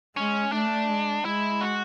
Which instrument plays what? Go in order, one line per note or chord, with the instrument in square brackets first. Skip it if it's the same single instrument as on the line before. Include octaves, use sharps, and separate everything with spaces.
[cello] G#3 [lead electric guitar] C#4
[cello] A3 [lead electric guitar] D4
[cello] G#3
[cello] G#3 [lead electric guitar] E4
[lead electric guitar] F#4